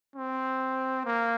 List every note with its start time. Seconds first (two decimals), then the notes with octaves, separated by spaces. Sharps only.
0.16 C4
1.05 A#3